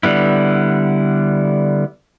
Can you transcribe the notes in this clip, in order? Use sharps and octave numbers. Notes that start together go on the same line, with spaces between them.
D3 G3 B3 E4